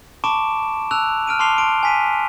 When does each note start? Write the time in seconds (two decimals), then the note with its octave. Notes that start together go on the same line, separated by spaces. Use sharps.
0.24 A5 B5 C#6 D6 D7 E7
0.91 A5 E6 F#6 F7
1.27 F6 D7 D#7
1.39 A5 C6 D6 C7 F7 G7
1.58 A5 C6 D7
1.83 G#5 B6 D#7